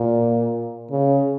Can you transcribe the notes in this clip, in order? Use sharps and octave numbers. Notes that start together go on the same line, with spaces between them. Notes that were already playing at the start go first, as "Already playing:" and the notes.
Already playing: A#2
C#3